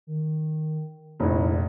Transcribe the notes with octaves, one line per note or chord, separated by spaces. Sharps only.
D#3
F1 A#1 E4